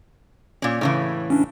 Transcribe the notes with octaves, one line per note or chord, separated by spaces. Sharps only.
A#2 C#4
A2 C#3 E3
C#4 D4